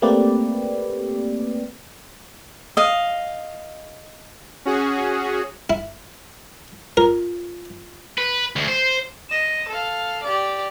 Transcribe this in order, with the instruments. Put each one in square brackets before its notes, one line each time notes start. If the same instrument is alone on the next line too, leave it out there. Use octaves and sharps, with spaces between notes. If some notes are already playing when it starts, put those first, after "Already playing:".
[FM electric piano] A3 A#3 C4 G4 B4 D5
[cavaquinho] D#5 F5
[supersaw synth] C#4 F#4 G#4
[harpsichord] E4
[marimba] F4 [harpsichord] A#4
[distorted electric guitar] B4
D2
C5
[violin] D#5 E7
A4 F5
G4 D5